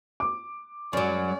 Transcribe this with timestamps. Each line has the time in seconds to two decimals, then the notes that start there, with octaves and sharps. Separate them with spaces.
0.20 D6
0.93 F#2 F#3 G#3 C#4 D5